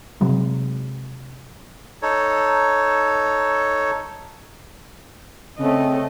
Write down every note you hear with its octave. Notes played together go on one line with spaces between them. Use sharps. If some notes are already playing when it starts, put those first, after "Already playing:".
C3 F#3 G#3
D#4 A4 C#5
C#3 A3 C4 D#5